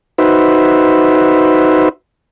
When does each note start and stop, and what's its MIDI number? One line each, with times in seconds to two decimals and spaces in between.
0.18 1.89 63
0.18 1.89 66
0.18 1.89 71
0.18 1.89 72
0.18 1.89 76